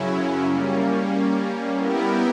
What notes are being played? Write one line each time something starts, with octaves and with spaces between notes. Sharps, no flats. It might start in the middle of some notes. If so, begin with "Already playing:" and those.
Already playing: F#2 C#3 F#3 C#4 E4
G3 A#3 C#4
G3 B3 E4 G4 A#4